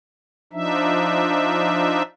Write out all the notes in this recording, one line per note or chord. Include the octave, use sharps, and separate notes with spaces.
F3 D4 D#4 E5